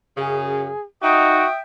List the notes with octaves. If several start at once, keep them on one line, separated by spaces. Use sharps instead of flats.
F#2 C#3 G#4
D#4 F#4 E5 G5 D#6